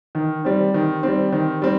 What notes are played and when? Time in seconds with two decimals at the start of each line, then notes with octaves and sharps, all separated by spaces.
0.15 D#3
0.45 G3 C4
0.74 D#3
1.03 G3 C4
1.32 D#3
1.62 G3 C4